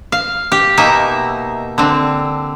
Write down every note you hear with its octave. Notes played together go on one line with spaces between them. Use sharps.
F5
G4
B2 A#3 D#4 E5
D3 C4